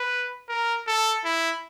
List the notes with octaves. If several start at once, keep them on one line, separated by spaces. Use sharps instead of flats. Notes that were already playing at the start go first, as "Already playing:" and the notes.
Already playing: B4
A#4
A4
E4